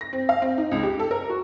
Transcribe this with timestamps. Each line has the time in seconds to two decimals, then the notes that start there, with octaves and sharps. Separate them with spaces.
0.01 A#6
0.13 C4
0.29 F5
0.42 C4
0.58 D#4
0.71 C#2
0.83 G4
0.99 A4
1.11 A#4
1.30 F#4